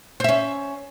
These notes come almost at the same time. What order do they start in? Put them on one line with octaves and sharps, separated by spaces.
C5 E5 C#4